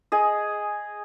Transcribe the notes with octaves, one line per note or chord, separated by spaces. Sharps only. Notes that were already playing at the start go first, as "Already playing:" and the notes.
G#4 D#5